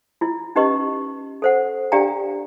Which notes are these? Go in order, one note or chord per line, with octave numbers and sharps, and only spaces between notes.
E4 F4
C#4 D#4 G4 B4 D#5 C#6
A4 C5 F#5
D4 G4 D5 F5 G5 A#5